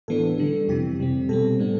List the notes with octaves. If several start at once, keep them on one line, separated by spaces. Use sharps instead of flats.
A2 E3 B3 D4 A4
D3 G3 D4
F2 C3 E3 G4
C3 G3 C4
B2 G3 C4 A4
A2 G3 B3 D4